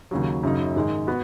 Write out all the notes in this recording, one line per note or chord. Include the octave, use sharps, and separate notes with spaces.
D#2 C#3 F#3
F#2 C#3 F#3 D#4
G#2 D#3 G#3
B3 F#4